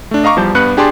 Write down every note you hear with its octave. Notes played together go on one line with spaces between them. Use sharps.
A3 D4
D#5 F5 A#5 C#6 D6
E2 F3 G3 A5 G6
G2 B3 B4 F#6 C#7
D4 G4 G#4 D5 A5 C6